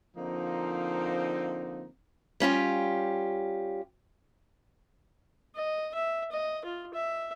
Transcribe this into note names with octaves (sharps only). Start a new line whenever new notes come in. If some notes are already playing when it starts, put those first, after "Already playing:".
D3 F3 A#3 C4 D#4
G3 C#4 F4 G4
D#5
E5
D#5
F4
E5